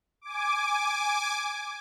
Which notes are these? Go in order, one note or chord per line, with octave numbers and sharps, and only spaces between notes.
G#5 D6